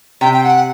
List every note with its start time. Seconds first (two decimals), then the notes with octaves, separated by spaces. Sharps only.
0.21 C3 G5
0.33 G5
0.44 F#5